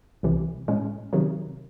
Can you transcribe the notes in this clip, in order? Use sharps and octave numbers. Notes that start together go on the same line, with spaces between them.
C2 C3 E3
A2 G#3 C#4
C3 D#3 F#3